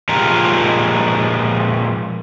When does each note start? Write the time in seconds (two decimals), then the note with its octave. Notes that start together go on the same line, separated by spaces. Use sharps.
0.09 A#2 F3 G#3 D#4 G4 A#4